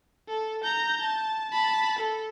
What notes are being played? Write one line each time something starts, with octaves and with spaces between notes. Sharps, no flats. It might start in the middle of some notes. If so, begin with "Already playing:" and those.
A4
A#5 G6
A5
A5 B5
A4